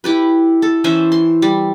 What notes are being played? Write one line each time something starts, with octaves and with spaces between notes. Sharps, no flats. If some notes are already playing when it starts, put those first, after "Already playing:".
E4 G4 B4
A4
E3 C#4 C5 E5
C6
G3